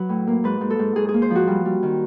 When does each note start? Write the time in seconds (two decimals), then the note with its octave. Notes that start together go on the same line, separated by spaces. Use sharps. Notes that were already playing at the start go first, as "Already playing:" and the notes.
Already playing: F#3 B4
0.09 A2
0.27 A#3
0.44 G#2 B4
0.61 G#2
0.70 A4
0.79 G#2
0.96 G#2 G#4
1.09 G#4
1.14 A#3
1.22 C5
1.30 F3 F#4
1.48 G3
1.65 G3
1.83 D#3